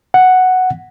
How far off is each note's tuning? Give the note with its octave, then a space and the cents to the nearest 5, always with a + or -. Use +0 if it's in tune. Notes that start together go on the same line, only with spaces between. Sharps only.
F#5 +0